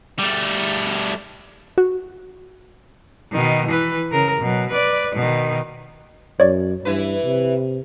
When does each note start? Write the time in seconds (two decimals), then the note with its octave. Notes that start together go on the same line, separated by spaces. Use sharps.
0.19 G3 A3
1.78 F#4
3.32 B2 D#3
3.67 E3 B4
4.11 C#3 A#4
4.40 B2 F#3
4.70 B4 D5
5.15 B2 D#3
6.40 F#2 C#5 D5
6.85 G2 E3 E4 B4
7.25 C3